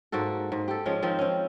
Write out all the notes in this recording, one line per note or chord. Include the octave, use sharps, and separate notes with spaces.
G#2 A#3 F#4 A4
G#2
G4 A4
F3 G#3 C#4
D#3 F3 C4
C4 C#4